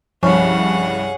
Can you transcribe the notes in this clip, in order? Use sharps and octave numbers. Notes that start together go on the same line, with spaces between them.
C2 G2 F3 C#4 G#4 F#5